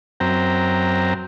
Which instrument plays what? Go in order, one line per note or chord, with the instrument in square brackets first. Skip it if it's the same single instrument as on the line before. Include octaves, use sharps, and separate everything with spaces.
[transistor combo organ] F#2 C4 G5 A#5